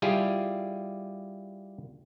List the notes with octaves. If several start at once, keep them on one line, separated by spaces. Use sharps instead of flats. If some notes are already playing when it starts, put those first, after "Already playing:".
G3 E4 F4 G4 G#4